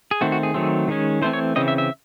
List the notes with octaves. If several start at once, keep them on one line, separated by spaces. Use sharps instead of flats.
G#4
D#3 A3 C4 F#4
F#4
G#4
D#3 F#3 A3 C4
D#3 G#3 C#4
E3 A3 C4 C5
C#5
C#3 E3 C4 D#5
E5
E5